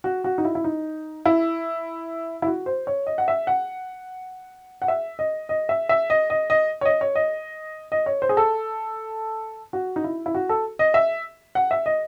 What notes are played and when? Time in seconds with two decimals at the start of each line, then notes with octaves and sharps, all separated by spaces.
0.04 F#4
0.24 F#4
0.38 D#4
0.45 E4
0.55 E4
0.64 D#4
1.26 E4
2.42 E4
2.47 F#4
2.66 C5
2.87 C#5
3.07 D#5
3.18 F#5
3.28 E5
3.47 F#5
4.82 F#5
4.88 E5
5.19 D#5
5.49 D#5
5.69 E5
5.89 E5
6.10 D#5
6.30 D#5
6.50 D#5
6.81 C#5
6.85 D#5
7.01 C#5
7.15 D#5
7.92 D#5
8.06 C#5
8.22 C5
8.29 G#4
8.37 A4
9.73 F#4
9.96 D#4
10.04 E4
10.26 E4
10.35 F#4
10.49 A4
10.79 D#5
10.94 E5
11.55 F#5
11.71 E5
11.86 D#5